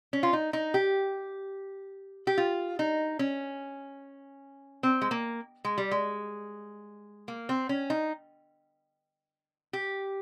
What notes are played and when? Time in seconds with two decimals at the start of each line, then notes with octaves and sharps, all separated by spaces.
0.13 C#4
0.23 F4
0.33 D#4
0.53 D#4
0.74 G4
2.27 G4
2.38 F4
2.79 D#4
3.19 C#4
4.83 C4
5.01 G#3
5.11 A#3
5.65 G#3
5.78 G3
5.91 G#3
7.28 A#3
7.49 C4
7.69 C#4
7.90 D#4
9.73 G4